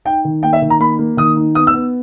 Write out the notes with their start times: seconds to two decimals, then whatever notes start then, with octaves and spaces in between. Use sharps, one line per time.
0.05 D#4 G5
0.25 D#3
0.43 A#3 G5
0.53 E5
0.62 D#3
0.70 A#5
0.80 A#3 B5
0.99 A#3
1.17 D#3 D#6
1.37 D#4
1.55 B3 D#6
1.67 E6
1.74 B3